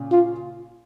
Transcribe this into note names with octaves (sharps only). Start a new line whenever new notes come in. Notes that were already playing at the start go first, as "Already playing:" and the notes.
Already playing: A#2 C#3
F4